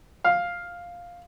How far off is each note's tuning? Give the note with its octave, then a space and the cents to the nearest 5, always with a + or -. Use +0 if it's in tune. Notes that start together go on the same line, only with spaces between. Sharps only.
F5 +5